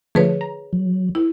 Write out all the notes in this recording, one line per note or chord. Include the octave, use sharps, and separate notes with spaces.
D3 F3 A3 G#4 B4 C#5
A#5
F#3
E4